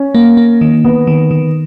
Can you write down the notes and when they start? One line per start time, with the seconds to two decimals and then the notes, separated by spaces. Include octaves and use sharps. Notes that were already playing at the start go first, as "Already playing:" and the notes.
Already playing: C#4
0.15 A#3
0.37 A#3
0.61 D#3
0.84 D#3 B3
1.07 D#3
1.31 D#3